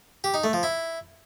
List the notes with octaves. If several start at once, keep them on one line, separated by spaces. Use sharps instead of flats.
G4
D#4
A3
F3
E4